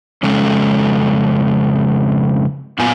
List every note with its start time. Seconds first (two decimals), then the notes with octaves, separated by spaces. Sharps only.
0.23 F2 C#3 G#3 C#4 A4
2.79 F#2 A#2 B3 F4 G#5